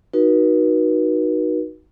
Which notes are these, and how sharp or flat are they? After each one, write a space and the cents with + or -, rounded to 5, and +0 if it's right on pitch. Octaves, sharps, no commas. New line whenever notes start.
D#4 +0 F#4 +0 B4 -45